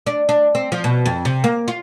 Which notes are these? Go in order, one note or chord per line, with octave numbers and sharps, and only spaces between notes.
D4
D4
C4
F3
B2
F2
C3
A#3
F4